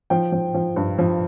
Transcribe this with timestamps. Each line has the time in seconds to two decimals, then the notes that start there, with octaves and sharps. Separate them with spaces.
0.10 F3 G5
0.32 F3
0.54 F3
0.76 G2
0.98 F3